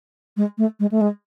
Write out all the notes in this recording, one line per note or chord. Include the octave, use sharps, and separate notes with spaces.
G#3
A3
G#3
A3
G#3